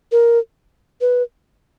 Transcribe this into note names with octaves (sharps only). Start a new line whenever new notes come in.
A#4
B4